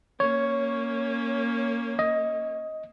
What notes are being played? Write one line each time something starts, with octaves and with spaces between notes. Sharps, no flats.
A#3 C#4 C#5
D#5